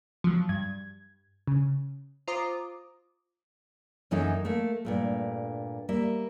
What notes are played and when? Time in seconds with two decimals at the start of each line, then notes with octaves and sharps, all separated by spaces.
0.24 F3 F#3
0.49 G2 G#6
1.47 C#3
2.28 F4 C5 A#5 D6 D#6
4.11 F#2 E3 C#4 D#4 A4 E5
4.45 A3 A#3
4.85 G2 A#2 A3
5.89 G3 A#3 E5